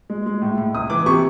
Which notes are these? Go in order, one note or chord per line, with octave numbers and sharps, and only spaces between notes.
G#3
G#3
A2
A2
C#2 D#6
E3 D6
C3 C#6